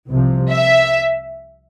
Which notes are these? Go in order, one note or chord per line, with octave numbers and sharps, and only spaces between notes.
C2 C3 F3
E5